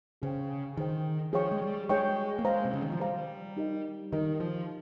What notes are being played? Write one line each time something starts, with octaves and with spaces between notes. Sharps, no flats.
C#3 G#4 C5 G5
D#3 G#4 C5 G5
F3 G#4 C#5 G5 C#6
G#3
G3
G#3 G#4 C#5 G5 C#6
A#3
G#3 C5 F5 A#5
C3
C#3
D#3
F3
G3 C5 F5 A#5
D#4 G4 A#4 D#5
D#3 D#4 G4 A#4 D#5
F3